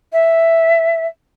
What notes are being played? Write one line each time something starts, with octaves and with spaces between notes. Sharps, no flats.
E5